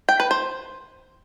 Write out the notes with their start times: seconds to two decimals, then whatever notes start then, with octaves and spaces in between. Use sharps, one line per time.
0.09 G5
0.20 B4
0.31 C5